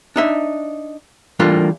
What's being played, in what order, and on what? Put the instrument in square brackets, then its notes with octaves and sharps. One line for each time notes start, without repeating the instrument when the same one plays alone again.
[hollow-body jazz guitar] D4 D#4 E5
E3 G3 A3 A#3 D4 F4